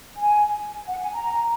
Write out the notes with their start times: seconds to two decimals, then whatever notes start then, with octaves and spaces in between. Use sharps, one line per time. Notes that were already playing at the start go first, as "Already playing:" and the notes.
0.17 G#5
0.89 F#5
1.01 G#5
1.14 A#5